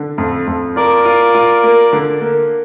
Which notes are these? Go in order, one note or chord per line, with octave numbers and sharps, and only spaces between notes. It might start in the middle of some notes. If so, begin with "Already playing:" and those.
Already playing: D3
F2
F2
F4 A#4 D5
F4
F4
A#3
D3
A#3